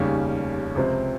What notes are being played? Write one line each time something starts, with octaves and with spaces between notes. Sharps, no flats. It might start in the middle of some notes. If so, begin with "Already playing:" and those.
Already playing: F1 D#2 C#3 G3 C#4
C#2 C3 F3 C4